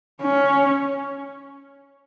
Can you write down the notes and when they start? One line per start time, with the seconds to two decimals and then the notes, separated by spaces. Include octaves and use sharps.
0.21 C#4